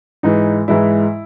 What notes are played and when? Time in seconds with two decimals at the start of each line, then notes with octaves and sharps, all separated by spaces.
0.23 G#2 E3 G#3 D#4
0.68 G#2 E3 G#3 E4